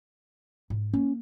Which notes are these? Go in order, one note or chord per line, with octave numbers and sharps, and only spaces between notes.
G#2
A#3 C#4